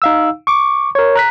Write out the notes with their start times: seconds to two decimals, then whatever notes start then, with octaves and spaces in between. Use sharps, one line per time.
0.02 D#4 F5 E6
0.47 C#6 D6
0.95 A#4 C#5
1.15 A#5 F#6 B6